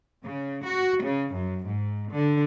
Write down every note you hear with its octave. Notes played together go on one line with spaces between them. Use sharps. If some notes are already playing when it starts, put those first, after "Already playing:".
C#3
F#4
C#3
F#2
G#2
D3